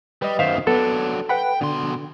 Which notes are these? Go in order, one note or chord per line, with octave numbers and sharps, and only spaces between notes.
G3 B4 D#5
F#2 D#3 C5 E5 F5
F#3 B3 D4 A4
B4 F#5 G5 B5
B2 D3 C6